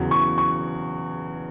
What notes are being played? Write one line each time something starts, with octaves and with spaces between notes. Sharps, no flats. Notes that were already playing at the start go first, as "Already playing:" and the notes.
Already playing: E2 C#3 F#3
C#6
C#6